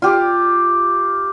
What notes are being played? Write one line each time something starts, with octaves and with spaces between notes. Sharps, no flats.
F4 G4